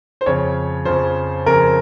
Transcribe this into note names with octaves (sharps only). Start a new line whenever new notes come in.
C5
F2 C#3 F3 C#5
F2 C#3 F3 C5
F2 C#3 F3 A#4